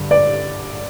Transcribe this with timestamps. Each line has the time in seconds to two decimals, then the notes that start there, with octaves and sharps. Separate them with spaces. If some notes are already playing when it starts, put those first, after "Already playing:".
Already playing: G2 D3
0.11 D5